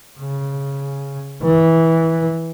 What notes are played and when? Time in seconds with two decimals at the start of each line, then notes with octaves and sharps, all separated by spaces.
0.20 C#3
1.43 E3